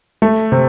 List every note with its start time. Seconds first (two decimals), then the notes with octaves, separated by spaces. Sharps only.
0.22 A3
0.52 C3